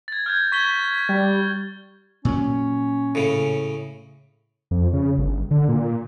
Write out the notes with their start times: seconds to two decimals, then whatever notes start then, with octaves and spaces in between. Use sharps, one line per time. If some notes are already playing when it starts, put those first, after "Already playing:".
0.08 G#6 A6
0.26 F6 G6 G#6
0.52 C#6 G#6 B6 G7
1.09 G3
2.25 A#2 F#3 C#4
3.15 A2 C#3
4.71 F2
4.93 C#3
5.18 G1
5.51 D3
5.68 A#2